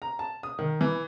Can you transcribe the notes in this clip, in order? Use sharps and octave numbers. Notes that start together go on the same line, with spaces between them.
A#5
A5
D#6
D#3
E3